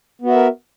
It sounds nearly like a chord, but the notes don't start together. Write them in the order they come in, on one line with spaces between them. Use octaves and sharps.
B3 F#4 E5 A#4